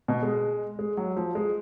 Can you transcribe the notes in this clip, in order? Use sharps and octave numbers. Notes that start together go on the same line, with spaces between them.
B2
G#3
G#3
F#3
F3
G#3